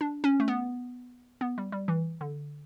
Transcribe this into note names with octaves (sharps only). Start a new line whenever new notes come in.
D4
C#4
A3
B3
B3
G3
G3
E3
D3